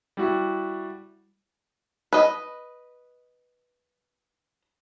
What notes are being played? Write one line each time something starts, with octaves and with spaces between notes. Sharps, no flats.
G3 E4 F#4
B4 D#5